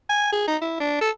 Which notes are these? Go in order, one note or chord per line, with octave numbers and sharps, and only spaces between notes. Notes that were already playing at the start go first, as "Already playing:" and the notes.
G#5
G#4
D#4
E4
D4
A4